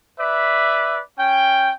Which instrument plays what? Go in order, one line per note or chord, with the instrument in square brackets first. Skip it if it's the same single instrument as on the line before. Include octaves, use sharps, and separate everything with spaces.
[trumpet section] B4 D5 E5
C#4 G5